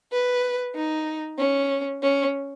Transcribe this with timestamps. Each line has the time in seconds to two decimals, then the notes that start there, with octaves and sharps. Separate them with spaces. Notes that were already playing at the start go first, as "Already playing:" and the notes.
0.12 B4
0.75 D#4
1.39 C#4
2.03 C#4